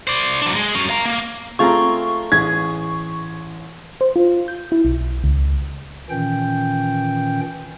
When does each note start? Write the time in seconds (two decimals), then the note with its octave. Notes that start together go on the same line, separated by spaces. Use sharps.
0.08 C5 D5
0.42 F#3 D4
0.56 G#3
0.75 F#3 C#4
0.90 F5 A#5
1.06 A#3
1.59 A3 C4 F4 G#4 A#5 C#6
2.32 A1 G#4 G#6
4.01 C5
4.16 F4
4.48 G6
4.72 E4
4.85 B1
5.24 C#2
6.10 A#2 D#3 E3 C#4 G5 G6